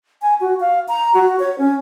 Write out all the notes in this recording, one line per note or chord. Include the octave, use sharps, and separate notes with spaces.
G#5
F#4
F5
A#5
F#4
C#5
C#4